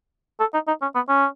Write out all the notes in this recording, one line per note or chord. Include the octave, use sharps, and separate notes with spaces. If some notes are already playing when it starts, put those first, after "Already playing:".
A4
D#4
D#4
C#4
B3
C#4